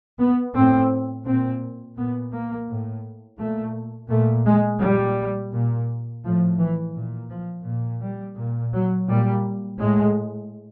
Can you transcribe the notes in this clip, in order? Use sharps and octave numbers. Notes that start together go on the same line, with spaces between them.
B3
A2 C4
A#2 C4
A#2 B3
A#3
A2
A#2 A3
A#2 A3
G#3
A#2 G3
A#2
A2 F3
E3
A#2
F3
A#2
G3
A#2
F#3
A#2 G3
A2 G#3